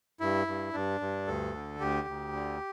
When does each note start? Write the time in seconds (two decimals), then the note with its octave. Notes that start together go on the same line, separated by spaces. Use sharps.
0.20 G2 E4
0.47 G2
0.73 G2 D4
1.01 G2
1.27 D2 A4
1.54 D3
1.80 D2 G4
2.07 D2
2.33 D3